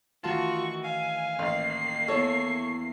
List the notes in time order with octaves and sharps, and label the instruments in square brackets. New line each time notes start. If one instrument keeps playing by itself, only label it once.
[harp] D#3 E3 A3 [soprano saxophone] F4 [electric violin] F#4 C#6 [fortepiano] A5
[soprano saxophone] F5 [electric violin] G#5
[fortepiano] A1 [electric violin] A#3 C7
[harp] E2 E4 [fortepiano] A4 C#5 [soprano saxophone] C#6